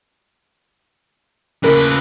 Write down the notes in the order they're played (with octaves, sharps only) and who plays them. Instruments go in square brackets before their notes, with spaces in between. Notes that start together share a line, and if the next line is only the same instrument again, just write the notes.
[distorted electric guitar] C#3 B4 [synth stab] A#3 A#4